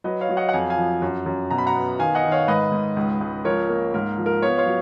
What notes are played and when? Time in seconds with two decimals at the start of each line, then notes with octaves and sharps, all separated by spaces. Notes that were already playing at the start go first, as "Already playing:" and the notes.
0.04 F#3 B4 D#5
0.21 C#5 F5
0.29 F#3
0.37 D#5 F#5
0.49 F#5
0.53 F2 F5 G#5
0.70 F5 G#5
0.77 F3
1.02 F#2
1.26 F#2
1.51 B2 A#5
1.58 B5
1.67 F#5 A#5
1.75 B3
1.99 D#3 F5 G#5
2.15 D#5 F#5
2.24 D#3
2.32 C#5 F5
2.48 G#2 B4 D#5
2.72 G#2
2.96 C#2
3.21 C#2
3.45 F3 A#4 C#5
3.69 A#3
3.94 G#2 A#4
4.18 F3
4.26 A#4
4.42 B3 C#5 F5
4.58 C#5 F5
4.66 F#3